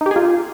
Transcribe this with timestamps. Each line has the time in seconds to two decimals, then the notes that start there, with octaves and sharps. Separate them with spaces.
0.01 D#4
0.06 G4
0.11 G#4
0.16 F4